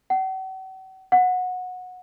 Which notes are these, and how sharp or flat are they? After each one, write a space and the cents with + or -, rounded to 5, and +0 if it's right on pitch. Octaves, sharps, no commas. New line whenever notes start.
F#5 +45
F#5 -20